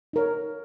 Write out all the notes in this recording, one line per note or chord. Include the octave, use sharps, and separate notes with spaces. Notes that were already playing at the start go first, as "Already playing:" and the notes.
D#4 A#4 C#5